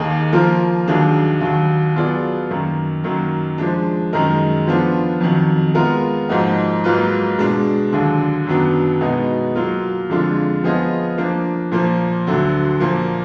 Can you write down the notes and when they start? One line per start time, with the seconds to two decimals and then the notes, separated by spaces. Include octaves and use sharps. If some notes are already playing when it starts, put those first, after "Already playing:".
Already playing: D#2 D#3 A#3 D#4 G#4
0.33 F3 A#3 F4 A#4
0.88 D#2 D#3 F#3 D4 G#4
1.41 D#2 D#3 F#3
1.96 F#3 B3 F4 G#4 D5
2.50 F#2 D#3 A#3
3.04 F#2 D#3 F#3 A#3
3.58 F3 G#3 D4
4.13 F#2 D#3 G#3 D#4 A#4
4.67 F3 B3 D4 F4
5.20 F2 D#3 F#3
5.75 G#3 B3 F4 A#4
6.29 G#2 F3 A#3 D#4 F#4
6.84 G#2 F#3 A#3 F4 B4
7.38 B2 G#3 D4
7.92 D#2 D3 F#3 D4
8.47 F#2 D#3 F#3 B3 D4
9.01 B2 G#3 B3 D#4 G#4
9.55 F#3 A#3 F4
10.09 F2 D3 G#3 D4 F4
10.63 F3 B3 F4 G#4 D#5
11.18 F3 A#3 D4
11.72 A#2 F3 A#3
12.27 D2 D3 F#3
12.80 A#2 F3 A#3